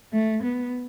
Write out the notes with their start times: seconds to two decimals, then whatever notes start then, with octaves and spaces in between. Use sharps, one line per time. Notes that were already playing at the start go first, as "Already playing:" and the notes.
0.13 A3
0.43 B3